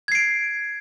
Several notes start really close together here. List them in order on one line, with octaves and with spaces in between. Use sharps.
G#6 C7 D7